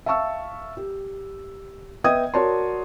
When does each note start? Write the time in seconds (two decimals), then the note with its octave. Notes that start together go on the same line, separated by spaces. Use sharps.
0.06 E5 F5 A5 C#6 E6
0.77 G4
2.04 B3 D#5 E5 G5 D#6 G#6
2.34 F#4 A#4 C#5 D5 A5 C6